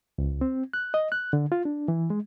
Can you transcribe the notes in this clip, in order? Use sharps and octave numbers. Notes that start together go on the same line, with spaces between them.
C#2
C4
F#6
D#5
F#6
D3
F4
D4
E3
G#3